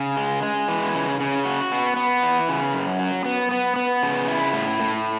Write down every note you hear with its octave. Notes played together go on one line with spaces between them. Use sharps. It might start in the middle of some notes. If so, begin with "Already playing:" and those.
Already playing: C#3
G#3
G#3
E3
C#3
C#3
F#4
B3
B3
E3
C#3
F#2
F#3
B3
B3
B3
C#3
E4
A2
A2